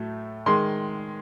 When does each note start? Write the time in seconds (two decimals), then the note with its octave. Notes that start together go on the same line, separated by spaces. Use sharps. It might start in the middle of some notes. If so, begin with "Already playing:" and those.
Already playing: A2 F#3 A3
0.46 D#3 G#3 C6